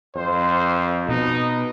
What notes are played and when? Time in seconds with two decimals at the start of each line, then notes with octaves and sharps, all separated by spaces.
0.16 F2 C5
1.09 B2 D#4